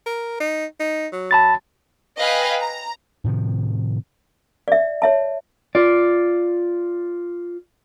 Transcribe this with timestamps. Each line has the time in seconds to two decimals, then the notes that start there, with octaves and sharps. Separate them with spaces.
0.06 A#4
0.40 D#4
0.80 D#4
1.12 F#3
1.31 A5 B5 A6
2.17 B4 D#5 F5 G5 G#5
2.60 A#5
3.24 A2 C3 D#3 F3
4.68 D5 E5
5.02 C#5 E5 A5
5.75 F4 D5